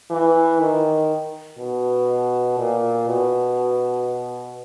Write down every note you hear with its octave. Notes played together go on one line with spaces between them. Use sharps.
E3
D#3
B2
A#2
B2